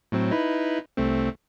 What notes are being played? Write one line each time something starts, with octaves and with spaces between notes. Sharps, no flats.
A2 F#3 C4
D#4 E4 B4
C2 A3 C4